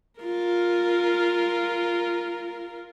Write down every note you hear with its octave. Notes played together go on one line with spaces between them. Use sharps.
F4 A#4